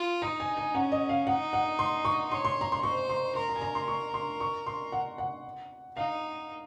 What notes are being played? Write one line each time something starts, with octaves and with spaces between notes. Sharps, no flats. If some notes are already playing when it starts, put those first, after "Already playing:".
Already playing: F4
D#4 A#5
G#5
G#5
C#4 F#5
D#5
F5
D#4 F#5
F#5
C6
C#6
C#5 C6
C6
A#5
C6
C5 C#6
C6
A#4 C6
A#5
G#5
A#5
C6
C#6
C6
C#6
C6
F#5
F#5
D#4 F5